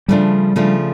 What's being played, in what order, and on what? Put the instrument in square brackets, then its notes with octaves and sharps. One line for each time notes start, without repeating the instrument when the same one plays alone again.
[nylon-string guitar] C#3 F3 A3 D4 F4 [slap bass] G3
[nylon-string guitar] C#3 F3 A3 D4 F4